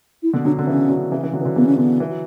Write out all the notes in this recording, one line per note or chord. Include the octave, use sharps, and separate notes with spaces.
E4
B2 D3
D3 F#3 D4
D3 B3
C#3 E3 C#4
D3 F#3
C#3 E3
C#3 E3
D3 F#3
E3
D3 F#3
C#3 E3 B3
C#4
B2 D3 B3
E3
F#3